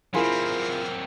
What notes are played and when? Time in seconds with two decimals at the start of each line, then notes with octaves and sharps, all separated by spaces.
0.14 F#3 C4 E4 F4 G#4 A#4